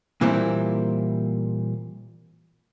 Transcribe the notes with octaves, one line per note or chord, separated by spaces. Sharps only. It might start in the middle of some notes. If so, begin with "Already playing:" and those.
A#2 E3 G3 A#3 C4 E4